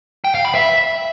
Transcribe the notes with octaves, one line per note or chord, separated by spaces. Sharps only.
G5
F5
B5
E5